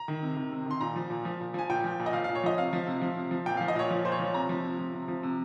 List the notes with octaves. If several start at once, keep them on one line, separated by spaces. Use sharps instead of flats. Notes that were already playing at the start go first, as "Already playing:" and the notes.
Already playing: A#5
D#3
C3
D#3
C3
D#3 C6
A#2 A#5
F3
A#2
F3
A#2
F3 G#5
A#2 G5
F3
A#2
D#5
F3 F5
A#2 F5
C#5
F3 D#5
C3 F5
F3
C3
F3
C3
F3
A#2 G5
F3 F5
D#5
A#2 C#5
F3
A#2 C5
C#5
F3
C3 A#5
F3
C3
F3
C3
F3
C3